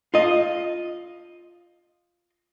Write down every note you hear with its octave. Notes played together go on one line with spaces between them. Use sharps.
F4 D#5